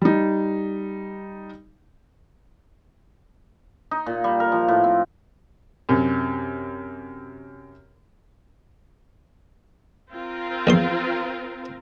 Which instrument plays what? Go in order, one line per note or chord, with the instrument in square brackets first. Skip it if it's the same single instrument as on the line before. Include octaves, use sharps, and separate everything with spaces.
[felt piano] G3 D#4
[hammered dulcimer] D#4
A#2
G3
A#4
F3
A2
C4
[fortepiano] F#2 C3
[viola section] C4 F4 A#4
[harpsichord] A#1 E2 C6